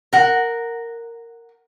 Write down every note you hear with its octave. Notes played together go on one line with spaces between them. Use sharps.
A#4 F#5